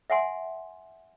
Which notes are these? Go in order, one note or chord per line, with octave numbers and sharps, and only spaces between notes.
E5 F#5 G#5 C6